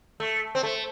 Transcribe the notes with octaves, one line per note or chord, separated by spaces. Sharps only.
A3
C4
A3